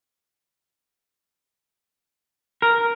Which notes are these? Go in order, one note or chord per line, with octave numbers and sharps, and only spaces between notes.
A#4